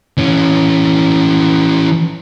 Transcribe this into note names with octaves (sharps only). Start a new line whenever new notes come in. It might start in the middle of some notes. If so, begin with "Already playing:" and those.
E3 C#4